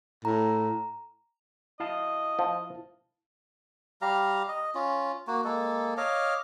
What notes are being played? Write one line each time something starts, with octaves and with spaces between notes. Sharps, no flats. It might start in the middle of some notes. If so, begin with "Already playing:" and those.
A2 A#5
E4 D#5 F5 A5
F3
G3 G4 F5 A#5
D#5
C#4 F4
A#3 F#4
G#3 A#3 A4
C#5 D#5 F5 D6